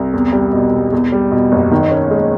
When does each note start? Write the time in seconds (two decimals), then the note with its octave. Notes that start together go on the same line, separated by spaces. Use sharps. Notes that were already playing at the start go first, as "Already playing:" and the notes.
Already playing: C2
0.13 E2
0.33 G3
0.53 B2
0.73 E1
0.92 E2
1.12 G3
1.31 B2
1.52 F#1
1.71 D#3
1.91 C#4
2.11 G#3